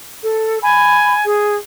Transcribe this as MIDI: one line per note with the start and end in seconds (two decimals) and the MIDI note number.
0.24 0.59 69
0.63 1.25 80
0.63 1.14 83
1.25 1.56 68